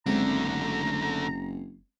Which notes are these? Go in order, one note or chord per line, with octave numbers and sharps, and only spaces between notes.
F#1 D3 G#3 A3 C4 C#4 A#5